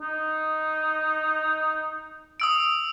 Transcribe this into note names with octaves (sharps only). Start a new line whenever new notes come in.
D#4
D#6 E6 D7